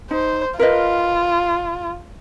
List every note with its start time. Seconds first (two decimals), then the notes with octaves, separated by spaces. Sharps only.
0.11 D#4 C5
0.59 F4 A#4 B4 D#5